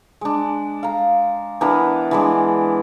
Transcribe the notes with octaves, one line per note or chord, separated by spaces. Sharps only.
G#3 D4
F5 A#5
E3 B3 D4 A#4
E3 G#3 D4